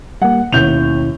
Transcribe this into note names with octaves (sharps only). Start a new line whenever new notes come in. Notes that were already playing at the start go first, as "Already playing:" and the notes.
G3 A#3 F#5
D#2 B2 C#4 E4 G6 F7